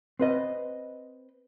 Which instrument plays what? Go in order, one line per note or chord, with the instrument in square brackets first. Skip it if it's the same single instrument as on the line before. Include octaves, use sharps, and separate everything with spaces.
[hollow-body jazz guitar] C4 B4 D#5